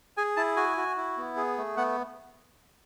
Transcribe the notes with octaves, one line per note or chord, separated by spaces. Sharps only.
G#4 G#5
E4 A5
F#4 G#5
F#4
E4
B3
G#4
A3
B3 F#5